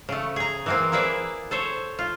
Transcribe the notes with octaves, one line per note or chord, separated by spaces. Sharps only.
C#3 A3
G#4 A#5
E3 A#3 C4
A#3 E4 G#4 B4 D5 E5
A4 C5 C#5
F4